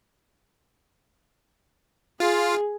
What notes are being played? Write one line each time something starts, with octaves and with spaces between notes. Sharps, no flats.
F4 G#4